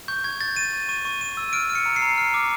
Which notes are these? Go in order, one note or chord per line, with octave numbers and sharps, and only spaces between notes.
C#6 G6
C#6 G#6
G6 A6
G6 D#7
C#6
C#6 D#7
C#6
C#6 D#7
E6
F6 D7
F6
C#7
A#5
C7
A#5
F6
D6